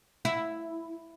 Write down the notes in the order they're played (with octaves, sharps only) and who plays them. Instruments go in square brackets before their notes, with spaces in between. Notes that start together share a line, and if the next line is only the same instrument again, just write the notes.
[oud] E4